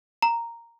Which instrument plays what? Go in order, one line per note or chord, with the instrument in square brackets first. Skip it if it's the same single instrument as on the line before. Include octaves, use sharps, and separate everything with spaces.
[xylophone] A#5